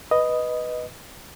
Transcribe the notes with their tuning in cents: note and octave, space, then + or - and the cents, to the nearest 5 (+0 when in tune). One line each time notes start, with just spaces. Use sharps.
B4 +0 D#5 +0